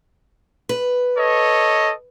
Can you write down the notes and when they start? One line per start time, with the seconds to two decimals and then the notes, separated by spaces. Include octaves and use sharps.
0.69 B4
1.17 A4 C#5 D#5